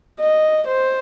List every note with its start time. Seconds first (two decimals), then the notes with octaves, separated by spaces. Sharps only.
0.20 D#5
0.67 C5